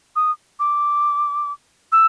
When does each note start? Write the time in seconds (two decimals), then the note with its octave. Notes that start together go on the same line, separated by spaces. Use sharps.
0.16 D#6
0.60 D6
1.92 E6